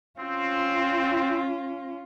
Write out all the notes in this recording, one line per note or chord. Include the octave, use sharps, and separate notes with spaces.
C4 C#4 F4